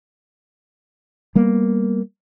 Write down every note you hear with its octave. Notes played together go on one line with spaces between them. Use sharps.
G3 A#3 B3